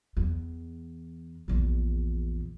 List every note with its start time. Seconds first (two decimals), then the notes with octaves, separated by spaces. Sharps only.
0.17 E2
1.48 A#1 E2